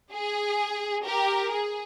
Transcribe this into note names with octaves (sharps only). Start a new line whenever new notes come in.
G#4
G4 A#4
G#4